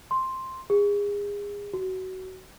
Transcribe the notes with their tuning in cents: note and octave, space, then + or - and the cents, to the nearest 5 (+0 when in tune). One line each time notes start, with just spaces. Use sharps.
C6 +5
G#4 -30
F#4 +20